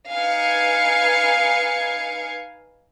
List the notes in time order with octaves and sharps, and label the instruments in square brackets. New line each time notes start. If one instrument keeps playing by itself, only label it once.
[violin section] D#4 B4 F5 G#5 G#6 C#7